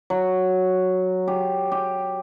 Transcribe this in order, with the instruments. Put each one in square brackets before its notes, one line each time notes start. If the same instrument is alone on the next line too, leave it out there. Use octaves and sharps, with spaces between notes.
[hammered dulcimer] F#3
G4
G4